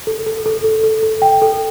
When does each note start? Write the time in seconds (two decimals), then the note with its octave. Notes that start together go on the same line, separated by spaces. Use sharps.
0.07 A4
0.26 A4
0.46 A4
0.64 A4
0.84 A4
1.03 A4
1.22 G5
1.42 A4